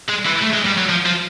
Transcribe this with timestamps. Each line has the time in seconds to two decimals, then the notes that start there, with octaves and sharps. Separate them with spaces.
0.09 G#3
0.25 E3
0.41 A3
0.53 G#3
0.66 G3
0.78 F#3
0.89 F3
1.06 F3